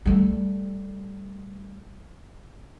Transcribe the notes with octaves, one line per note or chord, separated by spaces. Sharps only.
G3 A3